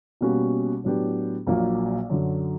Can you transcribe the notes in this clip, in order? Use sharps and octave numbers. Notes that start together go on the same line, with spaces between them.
B2 G3 A#3 C#4 F#4
A2 F#3 B3 D4 G4
A#1 A#2 F#3 A#3
F#2 D3 F#3